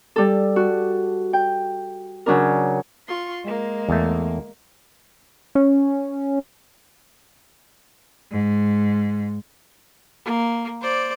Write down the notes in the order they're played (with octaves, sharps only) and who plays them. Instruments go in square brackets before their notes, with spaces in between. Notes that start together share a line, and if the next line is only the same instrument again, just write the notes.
[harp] G3 A4
F#4
G5
C#3 F#3 D4 A#4
[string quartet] F4 C6 C#6
G#3 A#3
[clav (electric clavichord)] E2 A3
[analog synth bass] C#4
[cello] G#2
[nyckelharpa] A#3
C5 D5